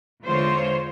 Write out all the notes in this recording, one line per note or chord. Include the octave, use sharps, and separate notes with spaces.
E2 D3 G#3 F4 C5 C#5